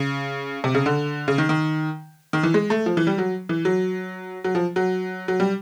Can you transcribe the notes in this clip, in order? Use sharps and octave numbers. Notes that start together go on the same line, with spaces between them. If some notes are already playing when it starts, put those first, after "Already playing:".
Already playing: C#3
C3
C#3
D3
C#3
D#3
D#3
D#3
E3
G#3
A3
F3
E3
G3
F#3
E3
F#3
F#3
F3
F#3
F#3
G3